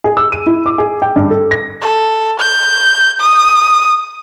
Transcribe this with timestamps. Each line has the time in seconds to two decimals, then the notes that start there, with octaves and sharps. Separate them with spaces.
0.04 G#4
0.17 E6
0.32 D#7
0.46 E4
0.66 D6
0.78 G#4
1.02 G5
1.16 G2
1.30 A4
1.51 A#6
1.82 A4
2.40 G6
3.20 D#6